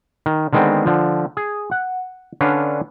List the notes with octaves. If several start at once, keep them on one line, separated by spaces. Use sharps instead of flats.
D#3
D3 D#3 G#3 B3 C4
D3 F3
G#4
F#5
D3 C#4 D4 B4 F5